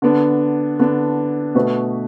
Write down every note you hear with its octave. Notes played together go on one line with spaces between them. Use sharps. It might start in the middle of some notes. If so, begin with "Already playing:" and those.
D3 B3 D4
D3 B3 D4
B2 A3 F#4 B4